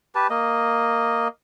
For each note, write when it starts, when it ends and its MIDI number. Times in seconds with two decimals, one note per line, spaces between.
0.15 0.27 67
0.15 0.27 71
0.15 0.27 81
0.30 1.28 58
0.30 1.28 75